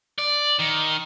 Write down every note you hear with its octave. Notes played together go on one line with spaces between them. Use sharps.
D5
D#3